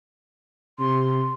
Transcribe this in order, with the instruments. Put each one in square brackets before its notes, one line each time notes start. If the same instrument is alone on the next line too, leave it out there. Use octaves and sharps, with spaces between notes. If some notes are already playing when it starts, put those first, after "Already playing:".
[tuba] C3 [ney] C6